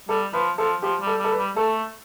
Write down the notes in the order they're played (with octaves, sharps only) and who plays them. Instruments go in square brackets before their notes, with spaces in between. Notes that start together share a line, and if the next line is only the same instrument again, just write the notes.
[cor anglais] G3 [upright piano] A4
[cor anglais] F3 [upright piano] B4
[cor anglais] F3 [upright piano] A4
[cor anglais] F3 [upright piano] G4
[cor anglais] G3
[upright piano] A4
[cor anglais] G3 [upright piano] A4
[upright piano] B4
[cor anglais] G3
[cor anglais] A3 [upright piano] A4